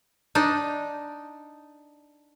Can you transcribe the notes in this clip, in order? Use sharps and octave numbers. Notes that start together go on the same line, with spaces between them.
D4 D#4